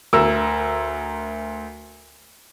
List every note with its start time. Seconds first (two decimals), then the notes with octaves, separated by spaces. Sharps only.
0.13 D2 A#4 E6